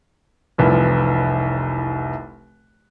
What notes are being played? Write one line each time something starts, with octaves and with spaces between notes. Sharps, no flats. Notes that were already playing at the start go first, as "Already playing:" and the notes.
F1 C2 E3 F3